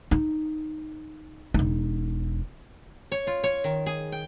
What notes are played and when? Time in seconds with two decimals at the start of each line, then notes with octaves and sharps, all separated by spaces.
0.11 D#4
1.54 E1 D#4
3.12 C#5
3.27 F4
3.44 C#5
3.64 D#3
3.86 G#4
4.12 G5